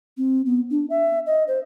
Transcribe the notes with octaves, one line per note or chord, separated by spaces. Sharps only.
C4
B3
D4
E5
D#5
C5